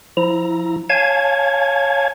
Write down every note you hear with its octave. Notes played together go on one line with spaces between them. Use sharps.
F3 E4 A#5
C#5 F5 G#5 A5 G#6